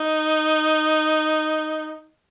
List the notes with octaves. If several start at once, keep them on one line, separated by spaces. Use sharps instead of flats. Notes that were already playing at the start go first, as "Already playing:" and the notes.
Already playing: D#4